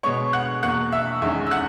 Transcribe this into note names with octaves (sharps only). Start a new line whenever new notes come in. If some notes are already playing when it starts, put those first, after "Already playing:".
B2 G#3 B3 C#5 C#6
F#5 F#6
E2 B2 A#3 F#5 F#6
E5 E6
E2 D#3 G#3 C#4 E5 E6
E6
F#5 F#6